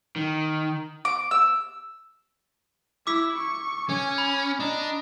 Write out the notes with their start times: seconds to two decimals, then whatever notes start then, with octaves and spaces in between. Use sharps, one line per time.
0.16 D#3
1.05 D6
1.31 E6
3.07 E4 D6 E6 B6
3.37 C#6
3.89 C#4 G#5
4.18 B5
4.60 D4 D#5 A#5